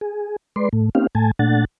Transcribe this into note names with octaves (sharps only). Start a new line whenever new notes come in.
G#4
G#3 B4 D5 C6
A2 A3
A#3 C4 C#4 D#4 G4 F5
A2 A3 G#5 A5
A#2 A3 D4 F#5 A6